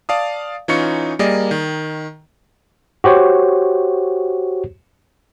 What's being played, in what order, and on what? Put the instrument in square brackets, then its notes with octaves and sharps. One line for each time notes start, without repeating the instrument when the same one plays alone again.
[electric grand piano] D5 F5 A5 D#6
E3 C#4 D#4 F4 C#6 C#7
G3 A#3 G#4 A#4 D5 D#5
D#3
[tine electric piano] F#4 G4 C5 C#5